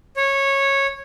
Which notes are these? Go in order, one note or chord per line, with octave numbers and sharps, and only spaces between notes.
C#5